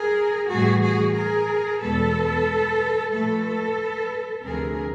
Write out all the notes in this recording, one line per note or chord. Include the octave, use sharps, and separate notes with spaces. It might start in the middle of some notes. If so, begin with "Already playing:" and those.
Already playing: G#4 A#4
A2 E3 G3 F#4 G#4
F#4 G#4
G#4 A#4
E2 B2 G#3 A4 B4
A#2 F3 A3 A4 B4
D2 C3 F3 G#4 A#4